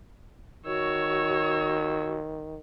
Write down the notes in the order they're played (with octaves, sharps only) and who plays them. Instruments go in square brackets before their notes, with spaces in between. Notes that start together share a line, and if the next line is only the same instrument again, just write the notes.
[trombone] D#3 [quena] F#4 [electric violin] C#5 E6